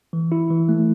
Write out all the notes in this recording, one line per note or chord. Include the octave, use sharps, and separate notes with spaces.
E3
E4
E3
A3